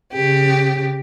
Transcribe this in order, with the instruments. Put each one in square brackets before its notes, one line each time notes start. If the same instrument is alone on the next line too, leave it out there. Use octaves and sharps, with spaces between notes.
[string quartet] C#3 G4